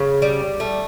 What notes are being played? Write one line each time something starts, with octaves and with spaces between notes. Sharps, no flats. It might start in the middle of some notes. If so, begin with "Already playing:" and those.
Already playing: C#3
G3
A3